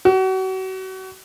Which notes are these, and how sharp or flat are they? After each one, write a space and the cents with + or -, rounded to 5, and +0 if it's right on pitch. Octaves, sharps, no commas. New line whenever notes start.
F#4 +35